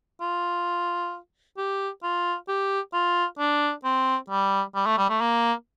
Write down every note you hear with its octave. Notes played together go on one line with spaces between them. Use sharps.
F4
G4
F4
G4
F4
D4
C4
G3
G3
A3
G3
A3
A#3